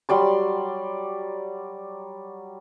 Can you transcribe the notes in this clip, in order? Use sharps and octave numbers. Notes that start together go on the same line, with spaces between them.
F#3 G3 D5 C6